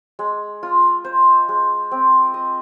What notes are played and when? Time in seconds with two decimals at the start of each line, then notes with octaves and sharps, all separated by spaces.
0.19 G#3
0.63 F4
1.05 C5
1.49 G#3
1.91 C4
2.34 D#5